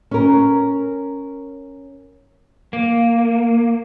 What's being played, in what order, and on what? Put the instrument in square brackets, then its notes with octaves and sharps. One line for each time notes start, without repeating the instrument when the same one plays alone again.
[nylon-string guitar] C#4 A#4
[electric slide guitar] A#3